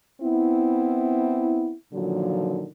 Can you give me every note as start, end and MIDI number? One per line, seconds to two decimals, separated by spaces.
0.21 1.72 59
0.21 1.72 60
0.21 1.72 64
1.93 2.65 46
1.93 2.65 50
1.93 2.65 51
1.93 2.65 53
1.93 2.65 54